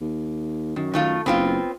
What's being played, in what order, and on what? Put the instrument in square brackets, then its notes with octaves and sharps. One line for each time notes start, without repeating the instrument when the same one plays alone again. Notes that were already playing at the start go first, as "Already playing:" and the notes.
[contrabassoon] D#2
[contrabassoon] F#2 [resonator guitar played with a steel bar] D#3
[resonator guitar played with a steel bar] D#3 A3 F4
[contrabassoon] F#1 [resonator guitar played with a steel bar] B3 C4 F4